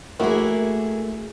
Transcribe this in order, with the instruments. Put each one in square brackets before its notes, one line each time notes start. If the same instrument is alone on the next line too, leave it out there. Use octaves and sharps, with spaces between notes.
[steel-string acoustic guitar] A3 G#4 [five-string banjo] A#3 E4 F#4